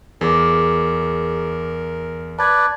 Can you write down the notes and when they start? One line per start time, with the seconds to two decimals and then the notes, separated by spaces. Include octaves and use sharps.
0.21 E2 G#4 A#4 B4 D6
2.39 B4 D5 A5 G#6